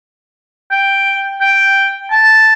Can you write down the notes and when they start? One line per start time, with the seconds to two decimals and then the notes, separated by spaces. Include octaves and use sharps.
0.71 G5
1.41 G5
2.11 A5